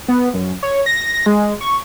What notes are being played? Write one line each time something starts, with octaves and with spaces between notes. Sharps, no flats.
B3
F#2
C#5
A#6
A#6
G#3
C#6